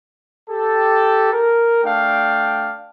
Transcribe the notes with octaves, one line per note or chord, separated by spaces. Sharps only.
G4 A4
A#4
A3 D4 F5 G5